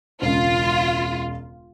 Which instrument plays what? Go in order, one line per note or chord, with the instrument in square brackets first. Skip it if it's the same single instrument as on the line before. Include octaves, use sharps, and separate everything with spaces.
[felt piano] E1 C#2 [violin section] F4